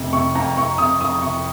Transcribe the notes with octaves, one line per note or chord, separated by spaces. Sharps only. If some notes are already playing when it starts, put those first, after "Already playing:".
Already playing: F1 F2 C3
C3 C#6
F2 A#5
F2 C#6
C3 D#6
F2 D#6
C3 C#6